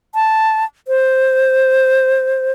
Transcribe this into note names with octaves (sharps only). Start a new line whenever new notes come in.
A5
C5